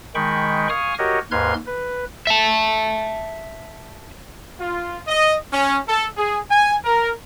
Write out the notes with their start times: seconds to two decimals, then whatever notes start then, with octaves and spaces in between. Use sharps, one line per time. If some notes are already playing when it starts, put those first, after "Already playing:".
0.15 D#3 G#3 G5 B5 C#6
0.70 F5 G#5 C#6 D#6 F6
0.99 F#4 G4 A#4 C#5 D#5
1.31 D#2 G#2 B4 C6 F6 G#6
1.67 B4
2.27 E5 A5
4.60 F4
5.08 D#5
5.52 C#4
5.88 A4
6.16 G#4
6.50 G#5
6.85 A#4